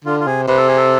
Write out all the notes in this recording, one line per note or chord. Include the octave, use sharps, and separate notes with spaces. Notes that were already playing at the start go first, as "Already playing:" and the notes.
D3 F4
F4
C3 G#4
C3 B4
A4
G#4
A4